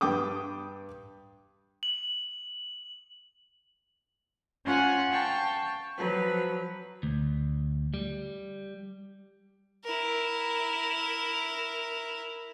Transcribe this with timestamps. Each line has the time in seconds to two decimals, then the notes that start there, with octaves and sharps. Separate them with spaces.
0.01 G2 G5 D6 D#6
1.83 F#7
4.65 C#4 F4 F#5 G#5
5.10 F5 G5 A5 C#6
5.96 F3 F#3 B4
7.03 D2
7.94 G3
9.84 E4 A#4